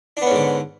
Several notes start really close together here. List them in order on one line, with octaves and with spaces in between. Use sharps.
D4 B3 C#4 G#2 D3